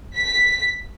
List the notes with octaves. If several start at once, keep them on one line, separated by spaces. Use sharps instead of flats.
B6